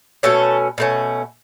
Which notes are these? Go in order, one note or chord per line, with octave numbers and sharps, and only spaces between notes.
B2 A3 C#4 A4
B2 A3 C#4